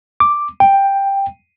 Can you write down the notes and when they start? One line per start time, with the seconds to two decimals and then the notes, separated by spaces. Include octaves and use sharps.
0.20 D6
0.60 G5